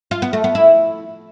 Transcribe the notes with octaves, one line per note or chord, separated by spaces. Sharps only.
F4
B3
A3
B3
E4